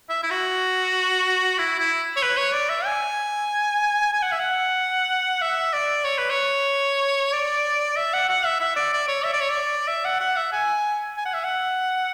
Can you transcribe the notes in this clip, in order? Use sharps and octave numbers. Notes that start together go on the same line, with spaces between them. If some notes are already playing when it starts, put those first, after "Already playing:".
E5
E4
F#4
E4
E4
C#5
B4
C#5
D5
E5
G#5
G#5
F#5
E5
F#5
E5
D5
C#5
B4
C#5
D5
E5
F#5
F#5
E5
E5
D5
D5
C#5
E5
D5
C#5
D5
E5
F#5
F#5
E5
G#5
G#5
F#5
E5
F#5